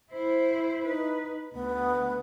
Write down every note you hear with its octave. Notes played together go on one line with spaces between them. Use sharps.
E4 C5
D#4 B4
D2 B3